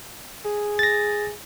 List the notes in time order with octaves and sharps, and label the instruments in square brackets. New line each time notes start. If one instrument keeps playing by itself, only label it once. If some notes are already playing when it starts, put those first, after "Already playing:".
[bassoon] G#4
[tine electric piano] A6 A#6